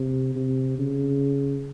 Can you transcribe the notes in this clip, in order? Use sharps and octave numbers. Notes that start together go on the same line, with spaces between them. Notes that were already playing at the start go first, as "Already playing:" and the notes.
Already playing: C3
C3
C#3